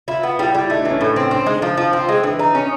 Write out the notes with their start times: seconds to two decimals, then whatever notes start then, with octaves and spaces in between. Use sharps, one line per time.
0.08 E4 F4
0.23 B3
0.39 G3 E4
0.54 G3 E4
0.70 A3 D#4
0.80 D4
0.85 E3 C#4
1.01 A2
1.16 C4
1.31 C4 D4
1.46 G#3 D#4
1.62 F3
1.77 F3
1.93 C4
2.09 G#3
2.23 E3 D4
2.39 D#4
2.55 C#4